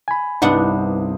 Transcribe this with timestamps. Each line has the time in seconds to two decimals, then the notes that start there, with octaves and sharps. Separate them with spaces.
0.08 G#5 B5
0.42 C2 G2 B3 C4 D4 D#4 F#5